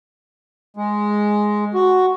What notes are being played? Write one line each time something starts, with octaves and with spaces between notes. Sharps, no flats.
G#3
F#4